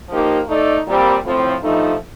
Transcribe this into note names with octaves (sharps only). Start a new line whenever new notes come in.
F3 A#3 D#4 G4
A3 D#4 A4 D5
A#2 G3 C4
A2 F3 C4
G2 F3 A3 D#4